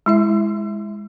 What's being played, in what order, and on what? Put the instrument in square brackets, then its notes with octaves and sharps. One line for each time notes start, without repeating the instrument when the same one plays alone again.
[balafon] G#3 E4 E5